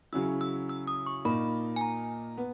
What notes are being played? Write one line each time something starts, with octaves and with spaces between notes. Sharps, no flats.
C#3 F#3 C#4 E4 E6
E6
E6
D#6
C#6
A#2 A#3 D#4 B5
G#5
A#5
B3